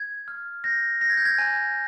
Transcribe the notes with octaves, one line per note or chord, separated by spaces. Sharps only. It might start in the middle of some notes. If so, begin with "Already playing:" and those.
Already playing: G#6
F6
G6 A#6
G6 A#6
G#6
G6
G#6
G#5